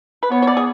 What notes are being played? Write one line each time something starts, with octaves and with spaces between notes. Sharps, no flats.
B4
B3 C#5
C#5
D5
G#4